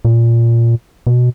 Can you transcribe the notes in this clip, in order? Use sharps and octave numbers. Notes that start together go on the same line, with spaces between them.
A#2
B2